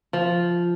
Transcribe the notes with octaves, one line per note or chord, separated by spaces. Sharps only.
F3